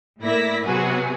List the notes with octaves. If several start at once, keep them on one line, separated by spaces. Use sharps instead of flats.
A2 A#3 E4 D5 A#6 B6
C3 F#3 B3 F#4 G#4 B4